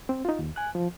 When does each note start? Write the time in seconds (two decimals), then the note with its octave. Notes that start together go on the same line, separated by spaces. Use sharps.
0.09 C4
0.25 D#4 F4
0.39 D#2
0.56 G#5 F#6
0.75 F3